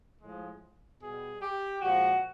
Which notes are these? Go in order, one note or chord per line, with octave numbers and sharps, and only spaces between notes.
A2 F3 G#3
B2 G3 G#4
G4
A#2 F3 G#3 F#4